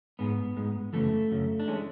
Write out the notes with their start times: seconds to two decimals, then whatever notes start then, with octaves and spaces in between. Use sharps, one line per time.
0.19 G#2 G#3 B3
0.57 G#2 G#3
0.93 F#2 C#3 E3 A3
1.31 F#2 C#3
1.60 D4
1.67 E3 G#3 C#4